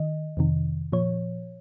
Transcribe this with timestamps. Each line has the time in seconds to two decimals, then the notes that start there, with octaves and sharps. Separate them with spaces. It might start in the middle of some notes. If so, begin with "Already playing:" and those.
Already playing: D#3 D#5
0.37 F2 C3 D#3
0.92 A#2 F3 C#5